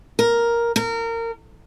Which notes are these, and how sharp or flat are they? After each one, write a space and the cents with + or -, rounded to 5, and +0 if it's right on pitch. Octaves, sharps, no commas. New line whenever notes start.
A#4 +5
A#4 -25